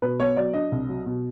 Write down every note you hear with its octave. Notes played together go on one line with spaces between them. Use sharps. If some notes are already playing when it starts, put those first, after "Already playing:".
B2 B4
B3 C#5
F#3 D5
D4 D#5
C2
F#3
B2